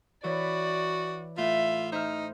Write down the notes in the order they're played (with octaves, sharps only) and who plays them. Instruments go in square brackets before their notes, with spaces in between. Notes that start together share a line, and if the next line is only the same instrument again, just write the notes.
[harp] E3 C#5 B5 [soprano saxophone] F#4 [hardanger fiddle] D5
[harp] A2 [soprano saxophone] F4 [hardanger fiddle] E5
[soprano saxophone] D#4 [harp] C5 F6